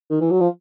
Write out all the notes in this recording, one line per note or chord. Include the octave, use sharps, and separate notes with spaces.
D#3
E3
F#3
F3